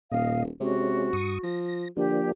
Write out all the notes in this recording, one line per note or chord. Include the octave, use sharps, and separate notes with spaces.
D#1 A#2 D#5 F5
C3 G#3 C#4 F#4
G2 C#6 D#6
F3 A#6
D3 F3 A#3 D4 G4